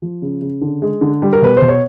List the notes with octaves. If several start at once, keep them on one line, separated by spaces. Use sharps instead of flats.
F3
C#3
C#3
D3
G#3
D3
G3
A#4
B2 B4
C5
B2
C#5